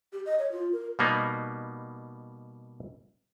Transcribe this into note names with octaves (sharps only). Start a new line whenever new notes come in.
G4
D#5
C#5
F4
A#4
B2 G3 A#3 B3 D#4